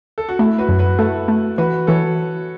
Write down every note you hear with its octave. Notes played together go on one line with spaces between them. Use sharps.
A4
F#4
A3 E4
F#4 B4
F#2
F#4 B4
A3 E4 A4
A3
E3 F#4 B4
E3 A4 C#5